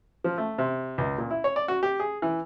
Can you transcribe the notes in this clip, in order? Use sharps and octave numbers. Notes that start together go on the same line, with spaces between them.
F3
A3
C3
C#2
A#2
E4
C#5
D5
F#4
G4
G#4
E3